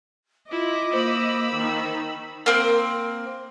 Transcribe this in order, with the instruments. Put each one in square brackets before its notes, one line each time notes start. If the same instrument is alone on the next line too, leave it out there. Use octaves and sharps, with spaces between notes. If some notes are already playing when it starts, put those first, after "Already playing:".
[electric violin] E4 [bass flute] F4 [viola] D#5 D6
[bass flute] A#3 [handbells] C5 [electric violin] B5 E6
[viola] D#3 D#4
[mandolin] A#3 C4